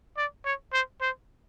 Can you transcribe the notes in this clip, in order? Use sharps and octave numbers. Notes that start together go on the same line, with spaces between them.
D5
C#5
C5
C5